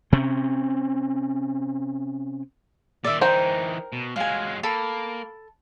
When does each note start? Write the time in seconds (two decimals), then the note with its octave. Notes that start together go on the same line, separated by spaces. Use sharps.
0.12 C3 C4 C#4
3.04 A#2 D#3 D5 E5
3.21 E3 D#4 A#4 C5 G5
3.93 B2
4.16 F#3 G#3 F5 G#5
4.63 A#3 A4 B5